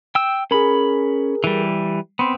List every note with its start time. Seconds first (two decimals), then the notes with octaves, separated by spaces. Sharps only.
0.15 G5 E6
0.51 C#4 G#4 A#4 B5
1.44 E3 G3
2.19 B3 C4 B5 C6